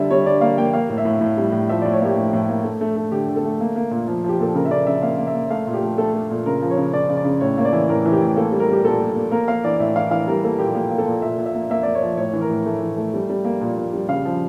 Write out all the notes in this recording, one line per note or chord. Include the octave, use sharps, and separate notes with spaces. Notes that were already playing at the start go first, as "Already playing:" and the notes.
Already playing: D3 G3 D5 E5
G3 C#5
D3 D5
A#3 F5
A#3 G5
A#3 F5
A2
E5
A2
A2
G3
A2
F3 E5
A2 D5
C#5
A#3 G4
A2
A2
A#3
A3
A3
A3
D3 G4
D3
A4
A3
A#3
A#3
A#2
F3
F3 G4
A#2 A4
C#3 A#4
E5
C#3 D5
C#3 E5
A#3 F5
A#3
E5
A#3
A3 F5
A#2
G4
A3
A3 A4
A3
A#2
C#3 A#4
F3
C#5
C#3
C#3 D5
C#3
D5
C#3
A2 C#5
A#3 C#5
D5
E3
A2 A#4
E3
G4
A2
A#3 A4
G3
A#4
G3 G4
A#2 A4
A#2
A#3
A#3 A#4
A#3 F5
E3 D5
A2 E5
E3 F5
E3 F5
G3 A#4
A#3 A4
A#2 G4
A#3 G4
A#3
A4
A#2
A#2 E5
A#2
E5
A#3
A#3 E5
A#3 D5
C#5
F3
A2 C#5
E3
A#4
A2
A3
E3
A3
G3
G3
A#3
A#2
A#2
G3
C#3 F5
F3